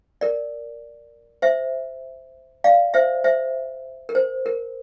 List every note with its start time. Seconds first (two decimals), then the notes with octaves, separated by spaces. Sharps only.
0.21 A#4 D5
1.42 C5 E5
2.64 D5 F5
2.94 C5 E5
3.24 C5 E5
4.09 A#4
4.15 C5
4.46 A#4